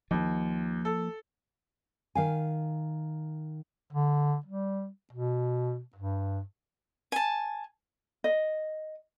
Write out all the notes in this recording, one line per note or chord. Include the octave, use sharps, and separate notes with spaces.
D#2 F3 A#3
A4
D#3 F5 G#5
D3
G3
B2
G2
G#5 A5
D#5